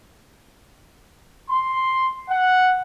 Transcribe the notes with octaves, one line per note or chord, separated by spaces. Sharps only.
C6
F#5